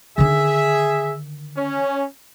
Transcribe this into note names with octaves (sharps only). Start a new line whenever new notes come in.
D3 D#3 G#4 E5
C#4